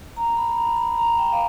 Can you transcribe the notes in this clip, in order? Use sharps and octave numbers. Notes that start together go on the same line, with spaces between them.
A#5
B5
A#5
B5
A#5
G5
F5